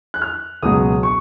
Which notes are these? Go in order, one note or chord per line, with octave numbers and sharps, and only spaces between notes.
F#6
F6
C#2 B2 F#3 D#6
C#6